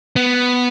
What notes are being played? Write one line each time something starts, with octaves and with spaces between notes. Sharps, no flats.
B3